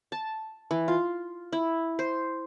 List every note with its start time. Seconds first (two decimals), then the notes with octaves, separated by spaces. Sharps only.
0.12 A5
0.71 E3
0.88 F4
1.52 E4
1.99 C5